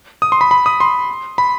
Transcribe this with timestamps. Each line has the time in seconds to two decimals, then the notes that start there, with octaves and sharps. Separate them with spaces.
0.22 D#6
0.32 C6
0.41 B5
0.51 B5
0.66 D#6
0.80 C6
1.38 B5